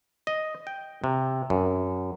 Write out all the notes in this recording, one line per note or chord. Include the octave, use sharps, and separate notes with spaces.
D#5
G5
C3
F#2